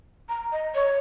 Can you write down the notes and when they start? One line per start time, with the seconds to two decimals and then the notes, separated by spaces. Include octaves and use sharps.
0.29 A#5
0.52 D#5
0.75 C#5